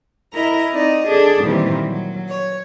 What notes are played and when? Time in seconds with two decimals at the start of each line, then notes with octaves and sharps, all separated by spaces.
0.33 E4 A#4 D#5 A#5
0.70 C4 D#4 D5 D#5
1.06 D4 G#4 A4
1.42 A#2 D#3 E3 G3 A#3 C4
1.84 F#3
2.27 C#5